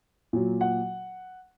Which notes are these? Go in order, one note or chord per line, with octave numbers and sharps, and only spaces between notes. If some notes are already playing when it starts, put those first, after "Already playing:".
A#2 F#3
F#5